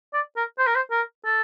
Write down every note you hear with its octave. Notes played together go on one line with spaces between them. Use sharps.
D5
A#4
C5
A#4
C5
A#4
A4